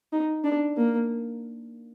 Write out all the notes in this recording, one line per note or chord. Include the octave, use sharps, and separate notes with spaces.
D#4
D4
A#3